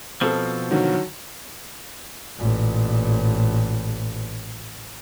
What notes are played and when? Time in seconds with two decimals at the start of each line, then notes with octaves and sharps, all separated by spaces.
0.21 B2 F3 C4 A4
0.71 D3 D#3 F#3
2.37 A1 A#2